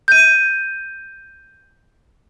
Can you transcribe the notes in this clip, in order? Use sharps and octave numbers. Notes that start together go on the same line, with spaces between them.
G6 D#7